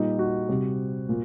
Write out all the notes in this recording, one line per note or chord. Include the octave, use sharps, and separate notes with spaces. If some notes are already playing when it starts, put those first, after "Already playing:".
Already playing: A#2 G3 D#4
F#4
C3 G3
A#2